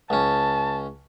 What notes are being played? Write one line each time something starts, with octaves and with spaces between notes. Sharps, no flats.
C#2 C#4 A5